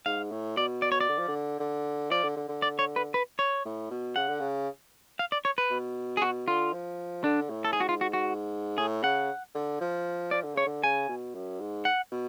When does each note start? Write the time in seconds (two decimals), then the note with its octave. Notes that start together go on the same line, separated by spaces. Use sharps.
0.06 G#2 F5
0.31 A2
0.57 B2 D5
0.82 D5
0.92 C#5
1.01 D5
1.09 D3
1.18 F3
1.28 D3
1.60 D3
2.11 F3 D5
2.24 D3
2.37 D3
2.49 D3
2.62 D5
2.79 C#5
2.96 B4
3.14 B4
3.39 C#5
3.65 A2
3.91 B2
4.16 C#3 F#5
4.28 D3
4.40 C#3
5.19 F5
5.32 D5
5.45 C#5
5.58 B4
5.70 B2
6.17 G#4
6.21 B2 F#4
6.47 D3 F4
6.73 F3
7.24 D3 D4
7.50 A2
7.65 A4
7.73 G#2 G#4
7.80 F#4
7.89 F4
8.01 F#4
8.13 F#4
8.78 A2 G#4
9.03 C#3 F#5
9.55 D3
9.81 F3
10.31 F3 D5
10.43 D3
10.55 C#3 C#5
10.66 D3
10.83 C#3 G#5
11.09 B2
11.34 F#2
11.60 G#2
11.85 F#5
12.12 B2